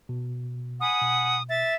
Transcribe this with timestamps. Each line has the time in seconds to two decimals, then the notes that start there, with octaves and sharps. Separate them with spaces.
0.09 B2
0.81 F#5 G#5 B5 D#6
1.01 B2
1.50 E5 A6